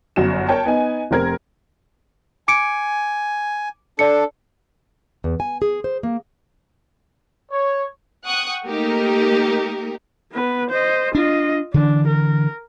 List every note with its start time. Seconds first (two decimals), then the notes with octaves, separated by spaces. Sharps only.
0.16 G1 F#2 F#4 E7
0.49 A#4 C#5 G5 A5
0.65 B3 D#4 G#5
1.11 F1 C4 A#4 G#6
2.48 G#5 D6 C#7 D7
3.99 D4 A4 D5 C#7
5.24 E2
5.40 G#5
5.62 G#4
5.84 C5
6.03 A#3
7.51 C#5
8.26 F#5 G5 C#6 D#6 F#6
8.67 A3 A#3 D#4 G4 A#4
10.33 B3 B4
10.70 C5 D#5
11.15 D4 F4 D#5
11.74 D3 E3 D4
12.08 A#4